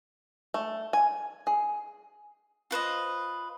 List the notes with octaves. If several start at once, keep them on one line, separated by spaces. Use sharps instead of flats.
A3
G#5
G#4
F4 B4 C5 D#5